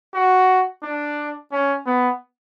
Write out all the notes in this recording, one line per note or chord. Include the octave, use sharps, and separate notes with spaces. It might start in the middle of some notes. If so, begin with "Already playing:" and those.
F#4
D4
C#4
B3